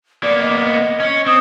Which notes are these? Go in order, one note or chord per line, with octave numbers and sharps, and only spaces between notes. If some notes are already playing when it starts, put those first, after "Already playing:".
A#3 B3 D5
D#5
C#4 C#5
C4 D#6